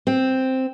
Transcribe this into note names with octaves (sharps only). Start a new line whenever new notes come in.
C4